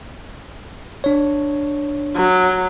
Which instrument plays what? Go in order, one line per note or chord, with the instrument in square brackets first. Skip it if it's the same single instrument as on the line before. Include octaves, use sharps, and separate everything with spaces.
[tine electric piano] D4 C#5
[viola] F#3